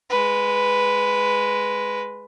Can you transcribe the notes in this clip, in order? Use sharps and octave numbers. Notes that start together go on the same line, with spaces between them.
G#3 B4